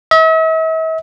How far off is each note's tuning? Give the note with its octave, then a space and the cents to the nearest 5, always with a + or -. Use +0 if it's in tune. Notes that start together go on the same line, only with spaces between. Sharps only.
E5 -45